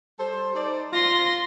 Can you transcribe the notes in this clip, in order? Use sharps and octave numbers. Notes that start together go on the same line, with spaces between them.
G3 A4 C5
D#4 C5 D5
F4 C6 A#6